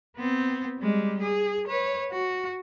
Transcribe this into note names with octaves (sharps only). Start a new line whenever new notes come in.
B3 C4
G3 G#3
G#4
B4 C#5
F#4